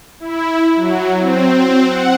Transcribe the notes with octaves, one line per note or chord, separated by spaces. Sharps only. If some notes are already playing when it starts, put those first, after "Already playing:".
E4
F#3
C4
F#5